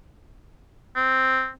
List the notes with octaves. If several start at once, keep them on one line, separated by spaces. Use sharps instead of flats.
C4